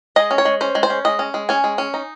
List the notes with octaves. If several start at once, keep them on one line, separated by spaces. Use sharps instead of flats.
G#3 D#5
C#4
C#5
G#3
C#4 C5
G#3
C5
C#4
G#3 D#5
C#4
G#3
C#4 G#5
G#3
C#4
D#4